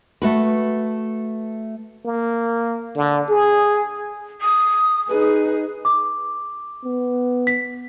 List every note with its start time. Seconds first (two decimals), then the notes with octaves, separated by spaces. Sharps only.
0.22 A3 F#4 B4
2.05 A#3
2.96 D3
3.29 G#4
4.41 D#6
5.09 D#4 G#4 B4
5.85 D6
6.85 B3
7.47 B6